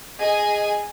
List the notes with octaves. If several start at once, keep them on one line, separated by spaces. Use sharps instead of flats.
G#4 D#5 G#5